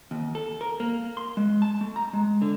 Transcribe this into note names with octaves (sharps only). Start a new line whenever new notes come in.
D#2
A4
A#4
A#3
C6
G#3
A5
A3
A#5
G#3
D3